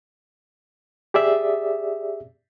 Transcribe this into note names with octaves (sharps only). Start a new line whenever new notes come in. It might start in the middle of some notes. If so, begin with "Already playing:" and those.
G4 G#4 D5 E5